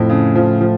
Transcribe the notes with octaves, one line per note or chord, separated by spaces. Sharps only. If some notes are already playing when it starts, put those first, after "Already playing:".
Already playing: F2 A2
C#3
F3
F3